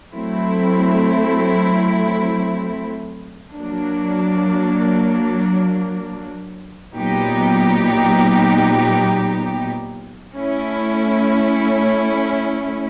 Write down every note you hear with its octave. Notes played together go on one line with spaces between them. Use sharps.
F#3 A3 C4 E4
F#3 A#3 D4
A#2 F#3 B3 D#4 G4
A3 C#4 E4